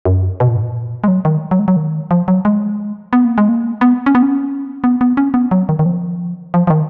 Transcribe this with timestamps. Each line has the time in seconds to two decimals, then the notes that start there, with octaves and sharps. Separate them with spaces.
0.05 F#2
0.40 B2
0.48 A#2
0.56 G#2
0.63 A#2
1.04 G#3
1.08 F#3
1.25 D#3
1.51 F#3
1.59 G#3
1.68 F#3
1.76 D#3
2.11 F3
2.28 F#3
2.45 G#3
3.13 B3
3.25 A#3
3.38 G#3
3.49 A#3
3.81 B3
4.06 C#4
4.15 B3
4.23 C#4
4.84 B3
5.01 B3
5.17 C#4
5.34 B3
5.51 F#3
5.69 D#3
5.79 D#3
5.86 F3
6.54 F3
6.67 F3
6.70 D#3